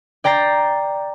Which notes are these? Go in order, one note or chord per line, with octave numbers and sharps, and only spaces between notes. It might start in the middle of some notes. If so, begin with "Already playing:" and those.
D5 G5 A#5 A6 C7